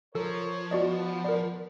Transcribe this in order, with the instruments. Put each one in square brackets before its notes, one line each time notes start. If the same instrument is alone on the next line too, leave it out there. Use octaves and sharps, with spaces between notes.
[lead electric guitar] F3 [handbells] A4 [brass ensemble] A#4 C#5
[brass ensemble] B3 [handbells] F#4 D5 D#5
[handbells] A#4 D5